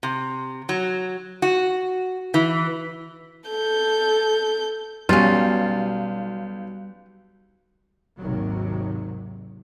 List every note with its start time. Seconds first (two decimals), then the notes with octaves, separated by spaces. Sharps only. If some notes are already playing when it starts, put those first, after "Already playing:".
0.03 C3
0.69 F#3
1.42 F#4
2.34 E3
3.49 A4 G6
5.09 B1 G3 C#4 F4
8.18 G#1 D#2 C3 D#3 F#3